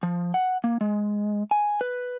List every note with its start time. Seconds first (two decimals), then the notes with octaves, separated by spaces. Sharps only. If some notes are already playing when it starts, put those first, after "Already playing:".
0.03 F3
0.34 F#5
0.64 A#3
0.81 G#3
1.51 G#5
1.81 B4